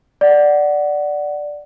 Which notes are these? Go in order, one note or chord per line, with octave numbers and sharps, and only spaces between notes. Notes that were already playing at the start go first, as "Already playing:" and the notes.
D5 F#5